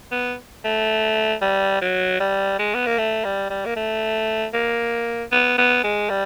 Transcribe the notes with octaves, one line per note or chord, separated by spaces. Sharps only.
B3
A3
G3
F#3
G3
G#3
B3
A#3
A3
G3
G3
A#3
A3
A#3
B3
B3
G#3
G3